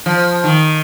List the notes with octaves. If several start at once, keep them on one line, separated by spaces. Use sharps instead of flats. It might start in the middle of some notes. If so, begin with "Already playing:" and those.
F3
D#3